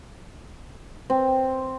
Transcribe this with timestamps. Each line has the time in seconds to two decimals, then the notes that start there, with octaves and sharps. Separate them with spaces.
1.10 C4